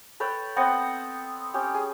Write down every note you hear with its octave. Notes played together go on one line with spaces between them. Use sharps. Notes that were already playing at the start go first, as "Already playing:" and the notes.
A4 B4 C#5 G5
B3 C4 D#5 F#5
C#4 G4
G#4